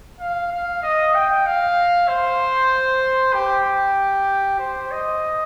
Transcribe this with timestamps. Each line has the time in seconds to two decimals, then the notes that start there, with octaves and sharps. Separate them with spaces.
0.20 F5
0.52 F5
0.83 D#5
1.14 G5
1.46 F5
2.08 C5
3.34 G4
4.59 C5
4.92 D#5